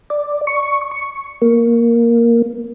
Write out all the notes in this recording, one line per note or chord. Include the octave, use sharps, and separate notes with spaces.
D5
C#6
C#6
A#3